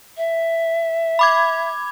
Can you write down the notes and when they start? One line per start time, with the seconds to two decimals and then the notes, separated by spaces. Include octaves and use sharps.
0.17 E5
1.19 B5 D6 G#6